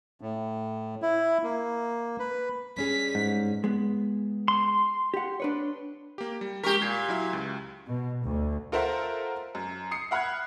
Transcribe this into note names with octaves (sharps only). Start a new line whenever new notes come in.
A2
E4
A#3
B4
G2 C#4 G#4 B6
G#2
G#3 B3
C6
G4 F#5
D4 B4 C#5
A#3 G4
G3
G#3 G4 A#4 C#6 B6
A#2 G#6 C7
F#3 E4 E5
C#2
B2
D2
F4 A4 A#4 C5 E5 F#5
F#2
D#6 C7 C#7
E5 F#5 B5 F6 F#6 G#6